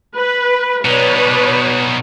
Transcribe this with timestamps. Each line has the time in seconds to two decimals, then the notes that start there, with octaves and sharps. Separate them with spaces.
0.16 B4
0.85 B2 D#4 B4 C#5 D5